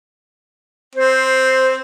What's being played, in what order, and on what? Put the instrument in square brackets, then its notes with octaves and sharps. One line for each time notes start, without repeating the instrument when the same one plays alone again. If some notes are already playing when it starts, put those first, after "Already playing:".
[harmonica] C4 [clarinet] C5